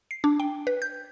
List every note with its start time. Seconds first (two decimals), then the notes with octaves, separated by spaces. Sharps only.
0.11 C7
0.24 D4
0.40 G5
0.67 B4
0.82 G6